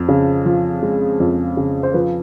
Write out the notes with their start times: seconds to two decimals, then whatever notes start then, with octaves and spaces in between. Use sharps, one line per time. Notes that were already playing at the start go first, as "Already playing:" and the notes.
Already playing: F2
0.09 C#3
0.46 F3
0.83 G#3
1.20 F2
1.57 C#3
1.83 C5
1.94 F3 B4